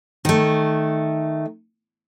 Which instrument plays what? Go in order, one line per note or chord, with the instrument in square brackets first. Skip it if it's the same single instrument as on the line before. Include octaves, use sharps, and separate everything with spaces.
[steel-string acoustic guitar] D#3 A3